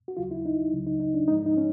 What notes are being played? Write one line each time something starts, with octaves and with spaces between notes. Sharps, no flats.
F#4
D#2 C#3 F#3 F4
E4
D#4
C#2 C#3 F#3
D#4
D#4
D4
G#2 F3 G#3 D#4
D#4
C#4